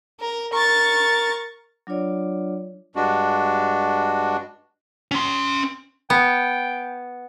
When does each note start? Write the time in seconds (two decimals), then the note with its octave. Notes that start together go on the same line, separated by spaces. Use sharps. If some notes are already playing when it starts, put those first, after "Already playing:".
0.20 A#4
0.53 A#4 C#6 A6
1.87 F#3 D4 F4 C#5 D5
2.96 G2 G#3 D4 F#4
5.11 C#4 C6
6.10 B3 G5